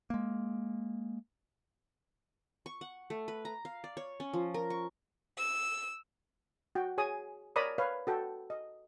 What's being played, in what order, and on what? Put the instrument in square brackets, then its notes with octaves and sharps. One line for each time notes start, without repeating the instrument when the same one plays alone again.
[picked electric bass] G#3 A#3
[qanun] C#6
F#5
A3
B4
A#5
F5
D5
C#5
C#4
F3
A#4
C#6
[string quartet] E6
[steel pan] F#4 G5
G#4 C#5 G#5 D#6
A#4 C#5 D5 A#5 B5 D#6
B4 C#5 F5
F#4 A4 G5
D#5